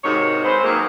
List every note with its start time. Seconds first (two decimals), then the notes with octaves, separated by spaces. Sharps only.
0.04 G#2 C3 D#4 F#4 A#4 C#5
0.44 G#3 C4 B4 C5
0.63 D#3 F#3 G#3 A#3